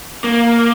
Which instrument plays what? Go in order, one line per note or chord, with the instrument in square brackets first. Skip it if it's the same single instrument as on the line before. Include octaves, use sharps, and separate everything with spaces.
[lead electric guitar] A#3